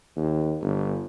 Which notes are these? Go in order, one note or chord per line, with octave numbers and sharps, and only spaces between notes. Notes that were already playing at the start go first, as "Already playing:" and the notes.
D#2
G1